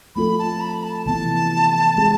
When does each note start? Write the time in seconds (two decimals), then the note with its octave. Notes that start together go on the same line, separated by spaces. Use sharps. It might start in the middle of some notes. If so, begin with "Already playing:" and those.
0.15 F3 A3 C4 F4 A4 B5
0.39 A5
0.60 B5
0.84 A5
1.06 C3 E3 B3 A5
1.96 G#3 C4 G#4